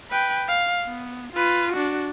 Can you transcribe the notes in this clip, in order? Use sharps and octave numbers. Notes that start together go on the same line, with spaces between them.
B4 G5
F5
B3
F4 B4
D4 F#4